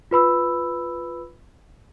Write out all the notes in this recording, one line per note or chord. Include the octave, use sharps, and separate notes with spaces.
F4 B4 B5 E6